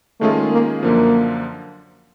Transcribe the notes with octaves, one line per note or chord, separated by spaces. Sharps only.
D#3 G#3 A3 C#4 F4 G#4
A#3
F#2 D3 F3 A#3